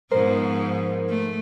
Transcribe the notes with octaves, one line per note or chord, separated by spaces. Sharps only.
G#2 F3 B3 A#4 C5
A3